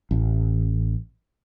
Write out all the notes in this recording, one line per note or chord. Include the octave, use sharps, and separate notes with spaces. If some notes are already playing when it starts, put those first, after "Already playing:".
A1